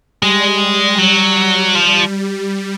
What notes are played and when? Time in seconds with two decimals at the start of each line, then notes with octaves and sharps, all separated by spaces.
0.22 G3 G#3
0.98 F#3
1.75 F3